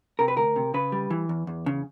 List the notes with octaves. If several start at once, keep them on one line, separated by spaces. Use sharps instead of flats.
C3 A#4
B4
D2 A#4
C3
C#3 B4
G3
E3
E2
E2
C#3